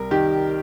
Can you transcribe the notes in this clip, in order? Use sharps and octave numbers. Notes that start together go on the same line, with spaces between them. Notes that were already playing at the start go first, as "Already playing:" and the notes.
Already playing: C2 A#4
D#3 G4